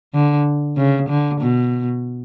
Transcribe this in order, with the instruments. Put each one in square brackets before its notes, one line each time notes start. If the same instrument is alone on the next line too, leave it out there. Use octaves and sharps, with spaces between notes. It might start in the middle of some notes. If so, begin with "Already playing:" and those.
[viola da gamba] D3
C#3
D3
B2